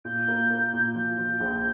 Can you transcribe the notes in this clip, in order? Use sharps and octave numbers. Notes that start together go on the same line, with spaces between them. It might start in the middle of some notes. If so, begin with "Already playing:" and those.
A#2 G6
A#3
A#3
A#2
F3 G6
F3
A#1